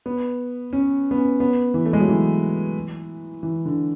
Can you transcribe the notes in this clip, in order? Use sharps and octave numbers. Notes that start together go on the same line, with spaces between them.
B3
C#4
B3
C#4
B3
E3
A3
G#3
F#3
E3
E3
D3